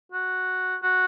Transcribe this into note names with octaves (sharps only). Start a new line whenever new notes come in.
F#4
F#4